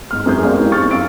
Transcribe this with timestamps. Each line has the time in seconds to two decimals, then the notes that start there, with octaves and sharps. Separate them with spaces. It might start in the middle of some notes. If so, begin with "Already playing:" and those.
0.11 G#2 F6
0.26 F#2 G#4 G6
0.43 G#3 B3 C4 A#4 D5 F5
0.58 C4 D#4 E4 G4
0.72 C#6 F6 A6
0.91 F#2 F5 E6 D7